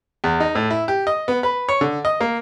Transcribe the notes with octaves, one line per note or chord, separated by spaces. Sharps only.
E2
D#4
A2
E4
G4
D#5
B3
B4
C#5
D3
D#5
A#3